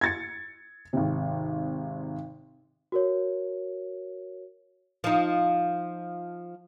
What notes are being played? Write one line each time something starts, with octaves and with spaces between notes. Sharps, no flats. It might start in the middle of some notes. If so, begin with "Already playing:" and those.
G#6 A6 C#7
G#1 C3
F#4 A#4 C#5
F3 D#4